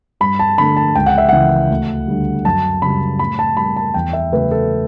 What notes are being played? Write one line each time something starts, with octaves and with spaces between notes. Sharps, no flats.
G2 B5
A5
D3 A3 B5
A5
C#2 G5
F#5
E5
C#3 E3 F#5
D2
D3 G3
F#2 A5
C#3 G3 B5
A2 B5
A5
G3 B5
A5
E2 G5
E5
C#3 F#3 A3 B4
A4